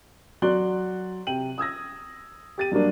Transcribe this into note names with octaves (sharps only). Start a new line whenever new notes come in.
F#3 F#4 D5 C6 F#6 G7
C3 G5 D#7 F#7
D#6 E6 G#6 A#6
G4 A6 D#7
G2 F#3 A#3 D4